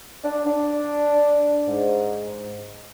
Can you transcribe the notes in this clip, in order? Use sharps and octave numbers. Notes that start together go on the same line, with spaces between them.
D4
D4
G#2